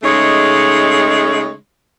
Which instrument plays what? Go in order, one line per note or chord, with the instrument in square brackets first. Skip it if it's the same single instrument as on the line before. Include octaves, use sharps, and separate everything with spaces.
[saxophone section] C#3 G#3 A3 D#4 C#5